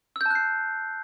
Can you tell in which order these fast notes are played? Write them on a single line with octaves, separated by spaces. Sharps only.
E6 G6 A5 F#6 C7